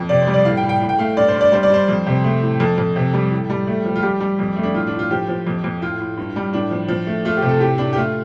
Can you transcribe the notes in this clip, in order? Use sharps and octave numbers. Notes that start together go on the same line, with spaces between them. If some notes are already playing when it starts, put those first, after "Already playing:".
Already playing: F2
C3 D5
C5
G3
D5
A2 F5
G5
A2
G5
A2
G5
A3 F5
G2 D5
C5
G2
D5
G3 C5
D5
G3 C5
F2
C3
A3
A2
F2 A4
F2
C3
G3
A2
G3
A3
F3
F4
G3 G4
G3
F2
A3
D4
A2 F4
D4
A2
F4
F3 G4
F3
F2
F2
A2 F4
A2
G2
G3
A2 D4
F3
F3
A3
A3 F4
G4
C3
A4
A2 G4
A2 D4
G4
A3 F4